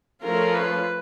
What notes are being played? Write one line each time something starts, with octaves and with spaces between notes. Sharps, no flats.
F3 A3 C#4 F4 A#4
B4